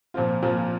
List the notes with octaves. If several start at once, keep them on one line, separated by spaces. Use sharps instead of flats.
A#2 F3 C4 F4
A#2 F3 C4 F4